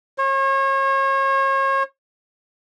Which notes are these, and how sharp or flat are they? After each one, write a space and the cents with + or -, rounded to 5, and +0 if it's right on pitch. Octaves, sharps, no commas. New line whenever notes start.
C#5 -35